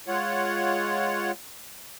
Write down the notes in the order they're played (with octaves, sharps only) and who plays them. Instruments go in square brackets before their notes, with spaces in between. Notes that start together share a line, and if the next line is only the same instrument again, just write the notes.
[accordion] G#3 F4 C#5 F#5